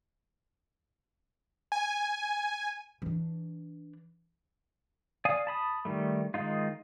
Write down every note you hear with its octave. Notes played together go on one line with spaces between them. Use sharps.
G#5
E3 D4
D5 F5 G#5 D#6
A5 B5 D#6
D#3 G3 A3
D#3 G#3 D#4 F4